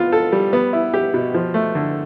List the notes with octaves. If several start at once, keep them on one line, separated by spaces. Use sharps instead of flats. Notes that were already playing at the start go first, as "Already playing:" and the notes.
Already playing: B3 F4
A4
G3
B3
E4
G4
B2
F3
A3
D3